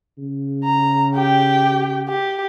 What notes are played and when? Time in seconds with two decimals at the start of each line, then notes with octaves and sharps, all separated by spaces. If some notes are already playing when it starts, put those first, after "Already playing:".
0.18 C#3
0.64 A#5
1.15 G4 G5
2.08 G4